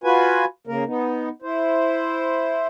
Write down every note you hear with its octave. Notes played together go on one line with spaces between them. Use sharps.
F4 F#4 B4 G#5
C#3 A#3 A#4
B3 D#4
E4 C5